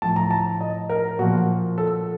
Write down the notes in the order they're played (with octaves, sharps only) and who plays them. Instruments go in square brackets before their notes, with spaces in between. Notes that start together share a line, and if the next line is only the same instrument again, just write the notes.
[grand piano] A2 F3 A5
A#5
A5
D#5
A#4
A#2 F3 F#4
A4